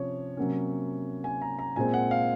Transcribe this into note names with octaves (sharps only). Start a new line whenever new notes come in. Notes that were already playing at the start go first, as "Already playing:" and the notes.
Already playing: C3 F3 C#4 C#5
C3 F#3 A#3 C#4
G#5
A#5
A#5
A#2 G#3 C4 G#5
F#5
F5